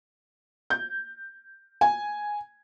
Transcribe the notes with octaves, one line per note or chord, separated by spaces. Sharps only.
G6
G#5